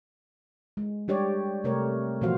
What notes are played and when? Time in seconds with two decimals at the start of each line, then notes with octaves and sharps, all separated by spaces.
0.77 G#3
1.08 G3 G4 C#5 D5
1.64 C3 A3 A#4 C#5
2.21 A#2 E3 F3 F#4 C5 F5